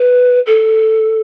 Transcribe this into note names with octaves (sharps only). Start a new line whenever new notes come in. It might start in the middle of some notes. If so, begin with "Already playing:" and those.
Already playing: B4
A4